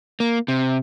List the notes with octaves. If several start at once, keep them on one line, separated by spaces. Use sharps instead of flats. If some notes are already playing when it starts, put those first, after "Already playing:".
A#3
C3